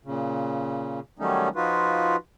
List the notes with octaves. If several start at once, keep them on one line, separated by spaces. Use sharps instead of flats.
A#2 C#3
D#3 F#3 G3 A3 C#4 D#4
F3 D#4 F4 F#4 B4